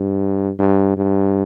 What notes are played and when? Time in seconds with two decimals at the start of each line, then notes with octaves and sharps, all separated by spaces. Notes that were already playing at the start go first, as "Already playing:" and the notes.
Already playing: G2
0.59 G2
0.97 G2